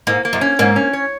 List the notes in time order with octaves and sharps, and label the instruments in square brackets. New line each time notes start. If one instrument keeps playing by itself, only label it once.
[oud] G#2 [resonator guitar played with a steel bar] A#3
[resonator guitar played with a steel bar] A#3
[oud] F#2
[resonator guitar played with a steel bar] C#4
[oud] G#2 [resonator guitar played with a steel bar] A#3
[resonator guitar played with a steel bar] C#4
C#5